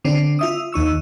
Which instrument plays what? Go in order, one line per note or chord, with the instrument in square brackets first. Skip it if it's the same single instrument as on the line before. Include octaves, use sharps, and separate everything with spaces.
[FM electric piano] D3 C4 D4
F4 E5 D#6
D#2 D#4 C#6 E6